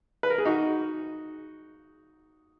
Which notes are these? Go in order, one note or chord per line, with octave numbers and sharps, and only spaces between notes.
B4
A#4
G#4
D#4 F#4